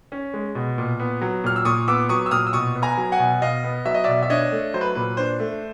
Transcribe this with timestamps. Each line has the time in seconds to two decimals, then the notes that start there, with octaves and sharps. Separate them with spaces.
0.12 C#4
0.33 G#3
0.55 B2
0.78 A#2
1.00 B3
1.21 F#3
1.44 A#2 F6
1.56 E6
1.65 A#2 C#6 D#6
1.88 B3 D6 E6
2.09 F#3 C#6 D#6
2.26 E6
2.31 A#2 D#6 F6
2.47 E6
2.53 B2 C#6 D#6
2.75 B3
2.82 G#5 A#5
2.97 F#3
3.12 F#5 G#5
3.19 B2
3.42 B2 D#5 F5
3.64 B3
3.86 F#3 E5
3.94 D#5
4.04 B2 D5 E5
4.23 E5
4.30 D4 C#5 D#5
4.52 A3
4.74 F#3 C5
4.81 B4
4.95 A#2 B4
5.17 D4 C5
5.40 A3